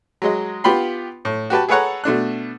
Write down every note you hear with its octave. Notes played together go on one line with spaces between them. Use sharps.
F#3 G#3 D#5
B3 F4 G4 B5 C6
A2
F#4 G4 B4 A5
G#4 A4 B4 C#5 F#5 A#5
B2 A3 D4 F#6